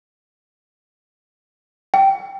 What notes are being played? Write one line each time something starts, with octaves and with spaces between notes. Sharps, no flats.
G5